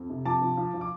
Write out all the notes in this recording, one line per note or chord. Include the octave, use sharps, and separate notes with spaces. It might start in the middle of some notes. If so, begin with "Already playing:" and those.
Already playing: F2
C3
F3 A5 D6
F3
F3
F3
D6